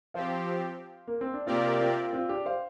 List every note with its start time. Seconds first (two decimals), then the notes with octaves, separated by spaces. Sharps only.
0.14 F3 C4 G4 C5 F5
1.08 A#3
1.21 C4
1.34 D4
1.47 C3 A#3 C4 F4 G4 A#4 D5
1.80 C4 F4
2.13 C4 F4
2.29 D4 G4
2.46 C5 F5